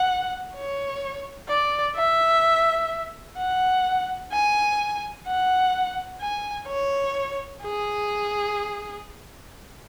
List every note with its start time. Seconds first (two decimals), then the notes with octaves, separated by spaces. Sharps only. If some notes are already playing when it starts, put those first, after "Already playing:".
Already playing: F#5
0.54 C#5
1.49 D5
1.96 E5
3.38 F#5
4.32 G#5
5.27 F#5
6.21 G#5
6.68 C#5
7.63 G#4